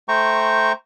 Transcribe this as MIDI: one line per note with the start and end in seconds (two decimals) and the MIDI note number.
0.08 0.72 57
0.08 0.72 72
0.08 0.72 79
0.08 0.72 82
0.08 0.72 85